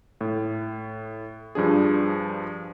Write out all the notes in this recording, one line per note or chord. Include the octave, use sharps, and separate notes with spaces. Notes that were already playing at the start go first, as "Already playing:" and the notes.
A2
G2 F3 D4 G#4